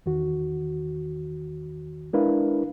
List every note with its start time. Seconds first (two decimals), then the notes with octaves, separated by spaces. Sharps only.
0.06 E2 D#3 F#4
2.13 G#3 D4 E4 A#4 B4 F5